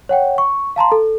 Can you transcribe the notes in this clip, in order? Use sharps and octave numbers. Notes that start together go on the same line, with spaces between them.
C#5 F#5 G5
C#6
F5 A5 A#5 C6
A4